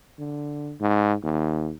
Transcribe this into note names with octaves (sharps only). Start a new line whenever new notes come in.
D3
G#2
D#2